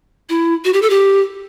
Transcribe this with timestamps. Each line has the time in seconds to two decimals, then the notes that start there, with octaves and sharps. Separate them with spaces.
0.29 E4
0.65 F#4
0.73 G4
0.82 A4
0.90 G4